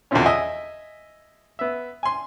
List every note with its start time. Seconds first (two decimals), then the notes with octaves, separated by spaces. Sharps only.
0.11 E2 B2 D3 F3 C4 C#4
0.26 D#5 E5 G#5
1.59 B3 E5
2.03 G#5 C6